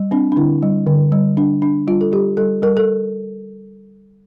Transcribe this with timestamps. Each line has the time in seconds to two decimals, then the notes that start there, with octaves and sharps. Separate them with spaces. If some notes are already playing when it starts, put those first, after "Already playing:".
Already playing: G3
0.11 C4 D4
0.32 D4
0.36 D3 E4
0.63 G3
0.87 D3
1.12 G3
1.37 D4
1.62 D4
1.87 G3 F4
2.01 A4
2.12 G3 G4
2.37 G3 A4
2.62 G3 A#4
2.77 A4